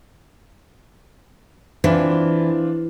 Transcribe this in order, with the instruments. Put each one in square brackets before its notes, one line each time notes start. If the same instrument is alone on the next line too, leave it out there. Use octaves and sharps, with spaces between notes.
[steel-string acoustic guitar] E3 [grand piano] C4 D4 F4